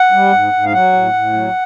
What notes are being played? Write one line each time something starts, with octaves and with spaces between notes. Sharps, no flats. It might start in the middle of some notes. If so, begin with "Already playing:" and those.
Already playing: F#5
G3
G#2
G#2
F5
F#3 F#5
A2
A2
F#3